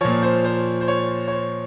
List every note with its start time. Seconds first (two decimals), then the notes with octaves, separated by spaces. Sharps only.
0.01 A#2 F3 C#5
0.22 C5
0.45 C5
0.81 C5
0.88 C#5
1.28 C#5
1.32 C5